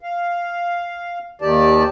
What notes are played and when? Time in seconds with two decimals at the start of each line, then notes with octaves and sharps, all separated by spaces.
0.01 F5
1.41 D#2 D#3 G4 D5 A5